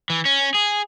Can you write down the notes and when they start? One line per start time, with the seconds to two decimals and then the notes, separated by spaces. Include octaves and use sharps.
0.10 E3
0.25 C#4
0.55 G#4